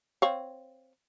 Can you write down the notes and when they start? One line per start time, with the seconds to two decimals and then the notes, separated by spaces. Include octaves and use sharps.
0.22 C4 C#5 F5